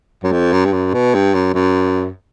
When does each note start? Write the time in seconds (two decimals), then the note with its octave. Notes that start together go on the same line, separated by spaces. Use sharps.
0.23 F#2
0.32 F2
0.53 F#2
0.65 G2
0.73 F#2
0.94 B2
1.14 G2
1.34 F#2
1.54 F#2